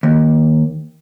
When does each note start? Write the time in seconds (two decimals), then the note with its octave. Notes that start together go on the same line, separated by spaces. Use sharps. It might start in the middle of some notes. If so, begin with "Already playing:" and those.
0.03 D#2